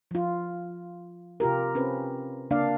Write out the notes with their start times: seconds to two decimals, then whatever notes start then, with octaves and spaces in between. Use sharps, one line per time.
0.11 F3 F4
1.40 C3 F4 G4 A#4
1.75 C4 C#4 B4
2.51 C#3 A#3 D4 D5 F5